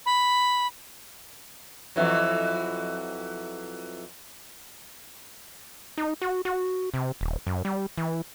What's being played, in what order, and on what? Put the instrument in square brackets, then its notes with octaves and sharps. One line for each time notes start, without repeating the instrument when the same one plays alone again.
[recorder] B5
[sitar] F2 E3 F#3
[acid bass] D#4
F#4
F#4
C3
D#1
F#2
G3
E3